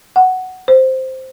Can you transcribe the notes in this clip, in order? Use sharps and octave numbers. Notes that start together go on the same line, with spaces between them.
F#5
C5